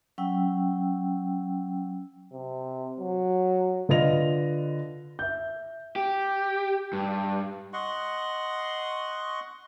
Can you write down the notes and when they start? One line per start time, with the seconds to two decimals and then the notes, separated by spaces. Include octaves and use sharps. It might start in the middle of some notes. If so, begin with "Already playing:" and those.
0.18 F#3 C#4 G5 E6
2.33 C3
3.00 F#3
3.89 D3 F4 B4 D#5 A#6 F7
5.19 E5 G6
5.96 G4
6.93 G2
7.73 D#5 F#5 C6 C#6